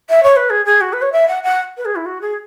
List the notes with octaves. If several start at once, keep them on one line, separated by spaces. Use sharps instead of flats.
E5
C#5
B4
G#4
G#4
F#4
B4
C#5
E5
F#5
F#5
B4
G#4
E4
F#4
G#4